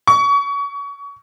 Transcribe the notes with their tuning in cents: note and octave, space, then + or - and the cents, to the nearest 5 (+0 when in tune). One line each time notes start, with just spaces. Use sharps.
C#6 +30